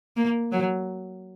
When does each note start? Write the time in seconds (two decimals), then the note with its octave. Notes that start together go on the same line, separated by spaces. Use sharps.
0.17 A#3
0.52 F#3